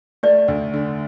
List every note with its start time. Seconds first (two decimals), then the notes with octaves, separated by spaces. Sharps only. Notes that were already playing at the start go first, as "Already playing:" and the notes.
0.23 A3 D5
0.48 D2
0.74 D3